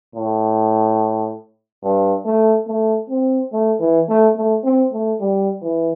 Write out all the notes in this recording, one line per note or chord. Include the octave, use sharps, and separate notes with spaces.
A2
G2
A3
A3
C4
A3
E3
A3
A3
C4
A3
G3
E3